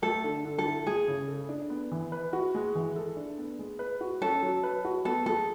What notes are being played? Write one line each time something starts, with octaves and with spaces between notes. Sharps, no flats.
A3 A4
D3
D3
A4
E4
G#3 G#4
C#3
A4
D4
B3
E3
B4
F#4
G#3
E3
A4
D4
B3
G#3
B4
F#4
C#4 A4
F#3
B4
F#4
B3 A4
G#3 A4